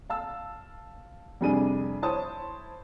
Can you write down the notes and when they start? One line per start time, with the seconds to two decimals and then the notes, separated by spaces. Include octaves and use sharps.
0.10 F5 A5 E6
1.41 F2 C3 G3 D4 G#4 D#7
2.02 E4 C5 C#5 A5 D#6